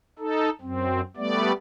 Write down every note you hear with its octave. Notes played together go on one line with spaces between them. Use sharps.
D#4 A4
F#2 C4
G3 A3 B3 D5